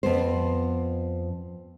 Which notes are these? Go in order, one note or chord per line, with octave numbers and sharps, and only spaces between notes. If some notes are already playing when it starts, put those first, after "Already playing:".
F2 B3 C5